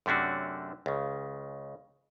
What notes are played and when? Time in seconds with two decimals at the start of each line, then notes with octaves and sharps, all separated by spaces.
0.06 F#2 C3 A3 C#4 D4 F#4
0.86 C#2 C#3